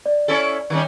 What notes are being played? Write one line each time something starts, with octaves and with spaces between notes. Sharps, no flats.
D5
C#4 E4 A4
D#3 G3 C#4